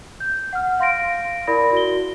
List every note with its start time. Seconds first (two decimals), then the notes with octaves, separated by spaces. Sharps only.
0.20 G6
0.53 F#5 F6
0.79 F5 C6 A#6 D7
1.47 E4 A#4 D5 B5 A#6
1.72 F#4 G7